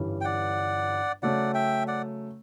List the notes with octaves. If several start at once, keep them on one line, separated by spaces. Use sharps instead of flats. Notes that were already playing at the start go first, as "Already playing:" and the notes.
Already playing: G1 G2 E3 G3 C#4
G5
D5 F#5
C#3 F#3 A3 C#4 D5 F#5
E5 G5
D5 F#5